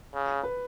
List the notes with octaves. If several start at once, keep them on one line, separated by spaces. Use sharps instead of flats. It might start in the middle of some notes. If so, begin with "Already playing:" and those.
C#3
B4